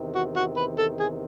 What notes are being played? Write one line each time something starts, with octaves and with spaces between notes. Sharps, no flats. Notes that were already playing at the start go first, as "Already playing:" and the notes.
Already playing: E2 C3 D#3
F#4
F#4
B4
A4
G#4